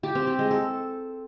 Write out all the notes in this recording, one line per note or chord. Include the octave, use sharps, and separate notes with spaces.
G4
C4
G4
G#3
A4